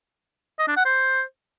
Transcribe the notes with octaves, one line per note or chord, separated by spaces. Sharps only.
D#5
D4
F#5
C5